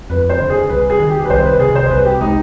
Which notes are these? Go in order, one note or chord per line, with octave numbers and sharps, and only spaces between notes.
F2 B4
C5
D3
G#4
C2 B4
G#4
D#3
G4
B4
C2 C5
B4
C3 G#4
C5
C2 B4
G4
G#3 D#4